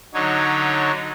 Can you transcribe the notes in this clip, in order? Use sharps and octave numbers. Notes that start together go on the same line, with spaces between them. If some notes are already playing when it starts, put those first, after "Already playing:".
D3 F#3 D#4 C#5